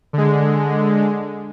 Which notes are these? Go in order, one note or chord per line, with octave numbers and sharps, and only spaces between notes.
D3 G#3